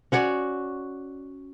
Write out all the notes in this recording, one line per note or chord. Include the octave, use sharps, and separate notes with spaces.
C#4 F#4 C#5 D5